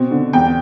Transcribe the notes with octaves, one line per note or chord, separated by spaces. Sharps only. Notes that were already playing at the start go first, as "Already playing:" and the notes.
Already playing: B2 C4
D3
E2 G5